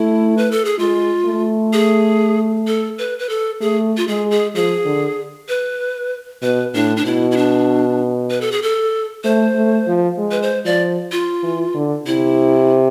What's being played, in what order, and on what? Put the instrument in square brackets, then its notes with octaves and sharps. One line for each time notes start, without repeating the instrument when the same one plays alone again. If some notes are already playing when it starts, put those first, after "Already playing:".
Already playing: [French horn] A3 [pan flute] E4
[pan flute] B4
A4
G#4
[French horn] G#3 [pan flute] F4
[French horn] A3
[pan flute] G#4
A4
B4
B4
A4
[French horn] A3 [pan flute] G#4
[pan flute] F4
[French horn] G#3 [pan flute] G#4
[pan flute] G#4
[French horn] F3 [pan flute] G#4
[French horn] D3
[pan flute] B4
[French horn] B2 [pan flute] B4
[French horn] A2 [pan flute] D4
[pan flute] D4
[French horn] B2 [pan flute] E4
[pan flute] E4
D4
B4
A4
G#4
A4
[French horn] A3 [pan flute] C5
[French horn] A3
F3
G#3
[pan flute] B4
C5
[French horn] F3 [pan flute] D5
[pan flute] F4
[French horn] E3
D3
[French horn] C3 [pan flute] E4